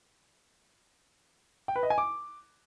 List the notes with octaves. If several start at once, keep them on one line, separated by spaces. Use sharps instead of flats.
G5
B4
D#5
G#5
D6